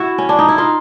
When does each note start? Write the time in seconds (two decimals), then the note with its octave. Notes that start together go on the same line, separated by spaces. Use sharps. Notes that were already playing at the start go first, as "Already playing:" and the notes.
Already playing: E4 F#4
0.18 C#4
0.29 D4
0.39 D#4
0.48 E4
0.58 D#4 F4